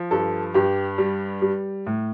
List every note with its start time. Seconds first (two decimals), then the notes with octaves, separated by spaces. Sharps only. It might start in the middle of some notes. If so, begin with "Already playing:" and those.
Already playing: F3
0.11 G2 A4
0.54 G2 G4
0.98 G3
1.42 G3
1.87 A2